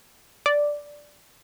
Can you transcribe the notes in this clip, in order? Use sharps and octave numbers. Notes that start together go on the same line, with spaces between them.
D5